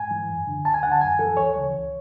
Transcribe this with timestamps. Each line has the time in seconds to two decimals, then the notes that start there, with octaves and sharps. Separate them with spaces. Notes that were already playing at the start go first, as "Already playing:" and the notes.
Already playing: G#2 G#5
0.11 E3
0.29 F#2
0.47 D3
0.65 D2 A5
0.74 G#5
0.83 D3 F#5
0.92 A5
1.01 F#2 G#5
1.19 E3 A4
1.37 D2 C#5
1.56 C#3 E3
1.73 C#2